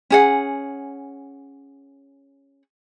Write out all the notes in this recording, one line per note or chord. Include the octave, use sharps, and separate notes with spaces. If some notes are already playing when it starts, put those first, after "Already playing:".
C#4 G#4 F#5